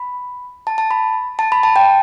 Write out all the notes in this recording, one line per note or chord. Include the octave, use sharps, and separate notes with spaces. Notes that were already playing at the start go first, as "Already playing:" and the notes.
Already playing: B5
A5
A5
B5
A5
B5
A5
G5